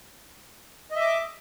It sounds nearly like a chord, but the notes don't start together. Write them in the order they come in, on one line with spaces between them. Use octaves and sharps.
D#5 E5 D6